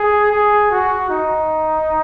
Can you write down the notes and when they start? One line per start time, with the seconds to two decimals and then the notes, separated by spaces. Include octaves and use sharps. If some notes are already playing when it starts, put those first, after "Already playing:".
Already playing: G#4
0.32 G#4
0.71 F#4
1.10 D#4